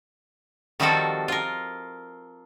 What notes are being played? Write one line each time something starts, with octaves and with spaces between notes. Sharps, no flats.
D#3 F3 G3 C4 F#4 A4
F4 A#4